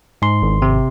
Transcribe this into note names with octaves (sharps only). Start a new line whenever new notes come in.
G#2 C6
G#1
C3